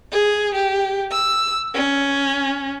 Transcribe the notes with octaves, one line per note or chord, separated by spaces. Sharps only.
G#4
G4
E6
C#4